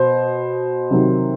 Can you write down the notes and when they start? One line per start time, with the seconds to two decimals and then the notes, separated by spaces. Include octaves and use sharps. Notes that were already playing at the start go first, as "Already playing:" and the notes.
Already playing: B2 C5
0.91 C3 D#3 F#3